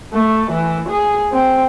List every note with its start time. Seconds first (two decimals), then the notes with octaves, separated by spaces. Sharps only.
0.13 A3
0.51 E3
0.89 G#4
1.32 C4